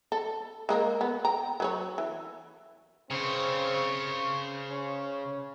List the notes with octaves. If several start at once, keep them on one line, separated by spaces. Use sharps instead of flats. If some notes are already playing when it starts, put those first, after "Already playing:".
A4
G#3 A#3 A#4
B3
G5 A#5
F#3 B4 C#5
E3
C#3 C4 C5 C#5
C#4